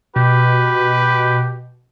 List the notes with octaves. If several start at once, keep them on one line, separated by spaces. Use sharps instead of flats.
B2 G4 B4